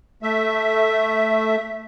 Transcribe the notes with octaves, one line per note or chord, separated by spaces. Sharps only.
A3 E5